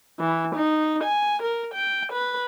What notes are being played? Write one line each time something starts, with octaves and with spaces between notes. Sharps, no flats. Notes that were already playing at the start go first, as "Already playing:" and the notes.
E3
D#4
G#5
A#4
G5
B4